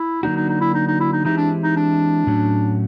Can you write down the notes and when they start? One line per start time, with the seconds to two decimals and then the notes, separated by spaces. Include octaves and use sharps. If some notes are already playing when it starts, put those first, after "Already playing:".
Already playing: E4
0.23 D3 F#3 A#3 D4 D#4 F#4
0.36 D#4
0.49 D#4
0.61 E4
0.74 D#4
0.87 D#4
1.00 E4
1.13 D#4
1.25 E3 G#3 C4 D#4 E4 G4
1.37 D4
1.63 D#4
1.76 D4
2.27 A2 F#3 A3 C#4 F#4